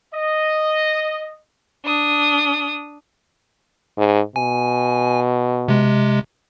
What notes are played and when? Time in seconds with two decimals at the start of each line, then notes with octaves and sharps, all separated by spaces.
0.14 D#5
1.85 D4 D#6
3.98 G#2
4.36 B2 G#5
5.68 C3 G#3